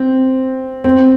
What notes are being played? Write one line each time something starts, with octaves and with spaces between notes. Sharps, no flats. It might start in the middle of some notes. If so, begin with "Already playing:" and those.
Already playing: C4
C4